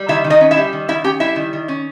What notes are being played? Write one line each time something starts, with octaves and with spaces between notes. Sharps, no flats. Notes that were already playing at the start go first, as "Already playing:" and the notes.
Already playing: G3
D#3 E4 E5
D#3
D#4 D#5
C#4
E4 E5
G3
D#3
D#3 E4 E5
C#4 G4 G5
G3 E4 E5
D#3
D#3
C#4